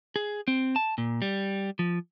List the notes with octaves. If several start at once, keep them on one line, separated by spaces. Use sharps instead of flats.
G#4
C4
A5
A#2
G3
F3